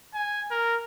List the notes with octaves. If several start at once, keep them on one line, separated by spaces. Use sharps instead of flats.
G#5
A#4